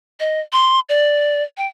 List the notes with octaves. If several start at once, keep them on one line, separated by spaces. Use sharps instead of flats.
D#5
C6
D5
G5